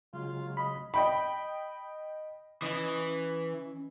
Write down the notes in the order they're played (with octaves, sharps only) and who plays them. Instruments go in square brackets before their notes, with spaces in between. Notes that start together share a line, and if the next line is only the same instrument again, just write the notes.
[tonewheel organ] C#3 F#3 G#3 [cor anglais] F4
[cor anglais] D#5 [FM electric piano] B5
[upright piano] D#5 G5 B5
[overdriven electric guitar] E3 [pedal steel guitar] C#4 D#5 D#6